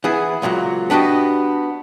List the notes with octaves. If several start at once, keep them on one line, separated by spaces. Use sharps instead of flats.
E3 B3 E4 G#4
C#2 A#2 F3 F#3
B3 D4 F#4 G4 D#5